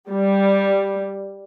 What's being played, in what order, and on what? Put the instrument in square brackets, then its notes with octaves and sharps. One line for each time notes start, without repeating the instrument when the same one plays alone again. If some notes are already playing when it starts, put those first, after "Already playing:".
[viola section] G3